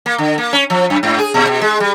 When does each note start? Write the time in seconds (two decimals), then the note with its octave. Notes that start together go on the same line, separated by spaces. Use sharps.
0.06 A#3
0.18 D3
0.38 A#3
0.53 C#4
0.70 F3
0.90 F#2
1.03 G#2
1.19 G#4
1.34 A#2
1.47 B2
1.61 G#3
1.80 G3